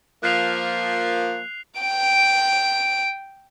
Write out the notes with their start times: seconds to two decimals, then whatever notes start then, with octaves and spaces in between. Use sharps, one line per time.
0.23 F3 A#3 F#6 C7 F7
1.81 G5 D7